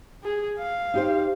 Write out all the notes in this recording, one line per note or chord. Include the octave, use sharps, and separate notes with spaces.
G#4
F5
D#4 G4 C5